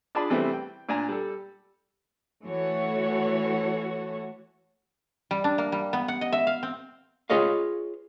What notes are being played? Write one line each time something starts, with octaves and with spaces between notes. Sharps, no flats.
D4 F4 G#4 D5 A5 B5
C3 E3 G3 A3 C4 E4
G5
A#2 D4 G#5 A#5
G3 A4
E3 A3 F#4 A4 C#5
G3
D4
A#3
G3
B3
F#5
D#5
E5
F5
C4
F4 G#4 B4 C#5 D#5 F5